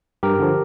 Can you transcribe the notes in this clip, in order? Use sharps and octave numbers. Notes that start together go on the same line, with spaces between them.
G2 G4 A#4
D3 F3